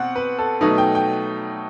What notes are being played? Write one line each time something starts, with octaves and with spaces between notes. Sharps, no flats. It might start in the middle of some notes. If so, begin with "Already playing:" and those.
Already playing: B2 C4 F#5
B4
A4
B2 F#3 A3 D#4 B4
G5
G5